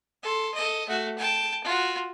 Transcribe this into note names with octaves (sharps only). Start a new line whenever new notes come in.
A4 C6
A4 D#5
A3 F#4
G5 A5
F4 F#4